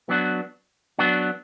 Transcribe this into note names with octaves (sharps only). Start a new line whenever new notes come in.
F#3 B3 D4 F#4
F#3 B3 D4 F#4